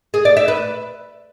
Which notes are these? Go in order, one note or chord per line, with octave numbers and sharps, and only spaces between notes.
G#4
D5
E5
B4